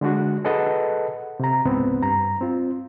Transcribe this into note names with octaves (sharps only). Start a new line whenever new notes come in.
D3 G#3 D4 F#4
G#4 A4 B4 D#5 F#5 A5
C3 A#5
C#2 G#2 B3 C4
G2 A#5
C4 F4